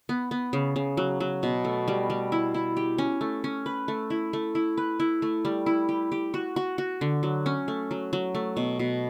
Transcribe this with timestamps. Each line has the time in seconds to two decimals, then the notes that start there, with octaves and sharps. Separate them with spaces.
0.09 B3
0.31 B3
0.53 C#3
0.76 C#3
0.97 F#3
1.20 F#3
1.43 B2
1.65 A3
1.88 G3
2.10 G3
2.32 E4
2.54 E4
2.77 G4
2.98 C#4
3.21 A3
3.44 C#4
3.66 B4
3.88 A3
4.10 E4
4.33 A3
4.55 E4
4.77 B4
5.00 E4
5.22 A3
5.45 G3
5.66 E4
5.89 G4
6.12 G4
6.34 F#4
6.56 F#4
6.78 F#4
7.01 D3
7.23 F#3
7.46 C#4
7.68 A3
7.91 F#3
8.13 F#3
8.35 A3
8.57 B2
8.79 B2